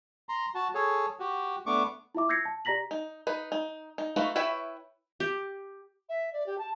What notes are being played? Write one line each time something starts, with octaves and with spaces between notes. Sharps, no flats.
A#5 C6
F#4 A5
G#4 A4 C#5
F#4 G4
A3 B3 D4 C#6 D6
E4 F4 E5 D6
E6 G6 G#6 A#6 C7 C#7
A5
G4 D5 A#5 A#6 B6 F#7
D#4
D#4 B4
D#4
D#4
A3 D#4 F4 F#4 B4
E4 B4 C#5 E5 G5
G4
E5
D5
G4
A5